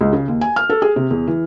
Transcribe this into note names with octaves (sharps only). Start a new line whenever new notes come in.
C#2
C#3
D#2
G#5
F6
A4
G#4
C3
E2
E3